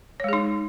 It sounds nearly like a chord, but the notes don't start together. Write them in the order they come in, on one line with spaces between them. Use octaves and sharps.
C#5 G#3 G#4 D#4